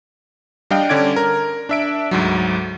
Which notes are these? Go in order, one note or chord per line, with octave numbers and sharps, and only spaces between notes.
G3 D4 D#5 F5 G5
D3 C#4 D5 G#6 D7
A#4
D4 E5 D7
D2 G#2 F#3